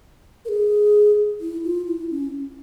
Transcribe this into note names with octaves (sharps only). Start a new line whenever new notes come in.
A#4
G#4
E4
F4
E4
C#4